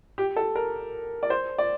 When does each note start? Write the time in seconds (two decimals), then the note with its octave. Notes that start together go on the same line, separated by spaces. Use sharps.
0.18 G4
0.36 A4
0.56 A#4
1.23 D5
1.30 C5
1.58 D5